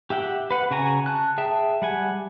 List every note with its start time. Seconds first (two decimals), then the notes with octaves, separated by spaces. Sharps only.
0.10 G4 E5 F#5 G5
0.51 B4 F#5
0.71 C#3 F#4 G#5 A#5
1.06 A5 F#6
1.38 G#4 E5 G5 A5
1.82 G3 F#5 G#5